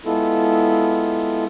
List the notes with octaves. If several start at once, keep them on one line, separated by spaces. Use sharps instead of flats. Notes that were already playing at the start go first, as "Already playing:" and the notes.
G#3 B3 E4 F4 A4